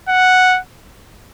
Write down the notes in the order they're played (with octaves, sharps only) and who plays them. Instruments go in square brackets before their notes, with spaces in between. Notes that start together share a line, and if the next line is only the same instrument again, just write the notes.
[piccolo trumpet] F#5